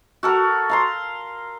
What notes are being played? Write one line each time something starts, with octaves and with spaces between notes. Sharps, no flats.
F#4 A4 A#4
F5 A#5 C6